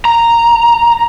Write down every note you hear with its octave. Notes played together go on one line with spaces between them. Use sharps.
A#5